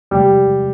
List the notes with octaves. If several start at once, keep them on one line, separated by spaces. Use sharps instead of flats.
E2 C3 F3 G3 G#3